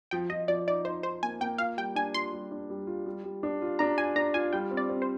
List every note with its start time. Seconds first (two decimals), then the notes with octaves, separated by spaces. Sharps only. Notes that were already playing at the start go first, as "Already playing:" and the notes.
0.11 F3 G5
0.30 F3 D#5
0.48 F3 D5
0.67 D#4 D5
0.85 D#4 C5
1.03 D#4 C5
1.23 A#3 G#5
1.40 A#3 G5
1.58 F4 F5
1.77 G3 G5
1.95 D4 G#5
2.14 F4 C6
2.33 G3
2.52 D4
2.70 G3
2.87 F4
3.06 G3
3.24 G3
3.43 D4
3.62 F4
3.79 D4 A#5
3.97 F4 G#5
4.16 D4 A#5
4.34 F4 G#5
4.53 G3 G5
4.71 C4
4.77 D5
4.89 C4
5.02 C5